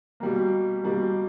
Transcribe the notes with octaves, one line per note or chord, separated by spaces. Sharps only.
B2 G3 A#3
B2 G3 A#3